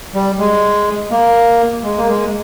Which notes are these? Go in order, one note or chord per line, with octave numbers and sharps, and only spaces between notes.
G3
G#3
A#3
G#3
A#3
G#3